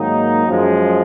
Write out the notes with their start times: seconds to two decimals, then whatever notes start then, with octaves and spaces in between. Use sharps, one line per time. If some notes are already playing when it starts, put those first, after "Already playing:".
Already playing: G#2 D#3 F#3 A#3 D#4
0.47 F#2 F3 G#3